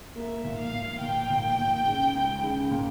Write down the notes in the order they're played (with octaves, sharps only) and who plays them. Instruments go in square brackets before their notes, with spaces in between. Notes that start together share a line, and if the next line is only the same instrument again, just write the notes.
[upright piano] A#3 [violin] E5
[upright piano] A#2
[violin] F5
[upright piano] A#2
[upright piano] A#2 [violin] G5
[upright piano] A#2
A#2
C#3
C#2
C#3
A#2